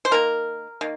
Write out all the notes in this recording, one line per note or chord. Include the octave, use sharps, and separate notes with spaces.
C5
D#3 A#3 A#4
D#3 A#3